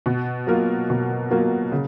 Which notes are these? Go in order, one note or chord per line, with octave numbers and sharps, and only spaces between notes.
B2
F#3 A#3 F4 A#4
B2
F#3 A#3 F4 A#4
C#3